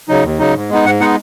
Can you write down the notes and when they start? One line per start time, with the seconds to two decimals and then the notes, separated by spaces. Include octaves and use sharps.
0.09 C#3 F#3 D#4
0.24 D#2
0.39 C#3 F#3 D#4
0.55 G#2
0.70 G#3 B3 D#4
0.85 G#2 F#5
1.00 G#3 B3 D#4 F#5